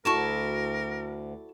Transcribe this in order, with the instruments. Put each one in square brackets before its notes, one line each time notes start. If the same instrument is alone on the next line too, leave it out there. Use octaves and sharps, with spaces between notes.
[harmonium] D2 [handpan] E4 F#4 A4 [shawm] A#4 [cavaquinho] D5 A5 C#6